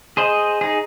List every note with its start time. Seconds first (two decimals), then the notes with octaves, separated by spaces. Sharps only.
0.17 G#4 C5 D#5
0.61 D#4 G#4